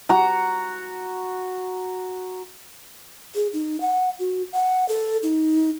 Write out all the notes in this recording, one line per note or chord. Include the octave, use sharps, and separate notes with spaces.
F#4 A#5
G#4
D#4
F#5
F#4
F#5
A4
D#4